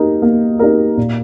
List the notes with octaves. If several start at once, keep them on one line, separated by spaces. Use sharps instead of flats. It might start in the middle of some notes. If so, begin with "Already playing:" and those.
Already playing: A#3 D#4 G4 A#4
A#3
D#4 G4 A#4
A#2